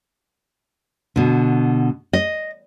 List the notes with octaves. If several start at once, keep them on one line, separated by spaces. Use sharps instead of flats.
B2 D3
D#5